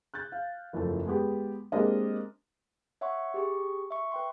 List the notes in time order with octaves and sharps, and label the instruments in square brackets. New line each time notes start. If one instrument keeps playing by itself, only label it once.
[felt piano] F#6 G6 A6
F5
F#1 E2 F3 A3
G#3 B3 G4
G#3 A#3 C4 D4 G4 D#5
[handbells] C#5 E5 F#5 C6 C#6
G4 G#4 C#6
E5 C#6
B4 G5 C6